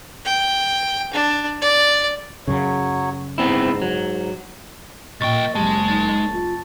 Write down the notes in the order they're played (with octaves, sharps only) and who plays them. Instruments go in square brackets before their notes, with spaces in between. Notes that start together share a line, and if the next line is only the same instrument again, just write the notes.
[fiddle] G5
D4
D5
[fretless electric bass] F#2 C#3 [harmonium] F#3 C#5
[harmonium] G#2 [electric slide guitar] B3 C4 E4
[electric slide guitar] F#3
[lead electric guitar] B1 G5 [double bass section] A#2 [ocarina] D#5 [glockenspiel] C#6 A6
[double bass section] F#1 F#2 [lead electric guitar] G#3 [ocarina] G4 [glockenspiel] A5
[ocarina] D#4 [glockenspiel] A6
[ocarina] F4